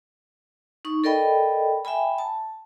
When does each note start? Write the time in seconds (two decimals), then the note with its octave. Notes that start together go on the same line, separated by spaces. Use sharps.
0.85 D#4 C#6
1.04 A4 A#4 D5 D#5 G5 B5
1.85 E5 G5 G#5 B5
2.18 A5